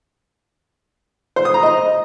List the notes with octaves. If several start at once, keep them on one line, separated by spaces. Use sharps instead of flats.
C5
D#6
A#5
D#5